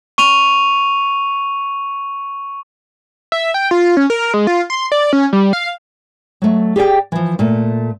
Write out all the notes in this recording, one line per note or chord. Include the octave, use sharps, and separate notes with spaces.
C#6 D#7 F7
E5
G5
F4
C#4
A#4
G#3
F4
C6
D5
C#4
G3
F5
F#3 A3
G4 G#4 D5 G5
E3 F3
A#2 A3